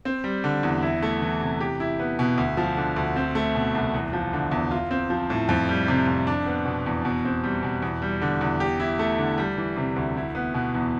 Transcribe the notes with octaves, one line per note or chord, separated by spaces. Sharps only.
C4
G3
D3
E2
E4
A3
E3
C3
G4
E4
B3
B2
D2
F3
D3
D2
C4
A3
B2
C2
E2
F3
D3
E2
F4
C4
F3
A2
F2
G3
C3
F2
D4
B3
B2
E2
B2
C4
G3
B2
E2
G3
D3
E2
G4
E4
A3
D3
G3
E3
C3
D2
E4
B3
B2
E2